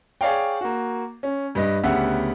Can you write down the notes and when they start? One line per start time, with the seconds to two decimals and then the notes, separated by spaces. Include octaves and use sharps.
0.21 G#4 C#5 D5 F5 G5
0.61 A#3 F#4
1.23 C#4
1.55 G2 B4 D#5
1.83 D2 C#3 B3 G4 E5 F#5